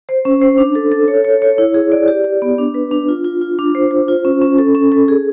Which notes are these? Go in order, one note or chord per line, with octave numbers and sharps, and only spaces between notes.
C5
C#4
C5
D4
A4
A4
C#5
C#5
C#5
E4
G#4
D5
G4
G4
B3
D4
B4
D4
F4
F4
F4
D4
C5
C5
F4
C#4
C#4
A4
C#4
A4
G#4